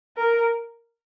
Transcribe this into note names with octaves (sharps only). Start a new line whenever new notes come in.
A#4